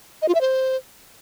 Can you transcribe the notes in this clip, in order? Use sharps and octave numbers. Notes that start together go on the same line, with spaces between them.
D#5
F4
E5
C5